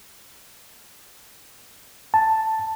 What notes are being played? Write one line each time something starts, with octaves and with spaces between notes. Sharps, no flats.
A5